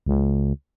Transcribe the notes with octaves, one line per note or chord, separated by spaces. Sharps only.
C#2